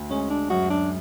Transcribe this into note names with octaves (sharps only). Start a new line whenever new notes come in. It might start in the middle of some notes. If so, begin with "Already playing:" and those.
Already playing: D2
G#3 C#4
D4
F#2 F#4
D4